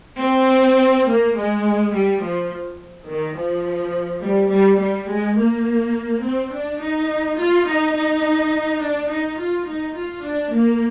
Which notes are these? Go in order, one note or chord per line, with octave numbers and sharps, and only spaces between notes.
C4
A#3
G#3
G3
F3
D#3
F3
G3
G3
G3
G#3
A#3
C4
D4
D#4
F4
D#4
D#4
D4
D#4
F4
D#4
F4
D4
A#3